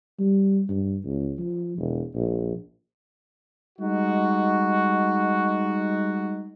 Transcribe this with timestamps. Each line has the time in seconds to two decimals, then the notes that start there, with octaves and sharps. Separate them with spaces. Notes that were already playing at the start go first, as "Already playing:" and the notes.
0.19 G3
0.69 G2
1.04 C#2
1.38 F3
1.78 E1
2.14 A#1
3.78 G3 G#3 D#4 F#4